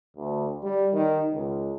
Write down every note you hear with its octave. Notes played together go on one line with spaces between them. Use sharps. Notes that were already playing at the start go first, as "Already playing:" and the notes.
D2
G3
D#3
C#2